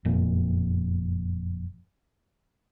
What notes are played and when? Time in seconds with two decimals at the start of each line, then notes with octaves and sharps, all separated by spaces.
0.05 F#1 F2 A#2